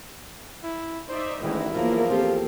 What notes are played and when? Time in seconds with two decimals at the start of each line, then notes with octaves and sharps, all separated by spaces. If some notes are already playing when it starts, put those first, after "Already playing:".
0.64 E4
1.08 D#4 C5 D5 E5
1.43 A1 D2 D#3 E3 G#3 D#4 E4
1.74 E2 F3 F#3 A#3 D#4 F4 A#4
2.10 A#3 C4 F4 G4 A4